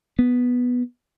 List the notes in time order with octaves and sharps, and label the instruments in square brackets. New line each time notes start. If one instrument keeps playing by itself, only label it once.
[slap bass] B3